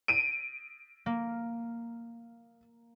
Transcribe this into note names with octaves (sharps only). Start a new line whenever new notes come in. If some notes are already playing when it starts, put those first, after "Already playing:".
D7 D#7
A#3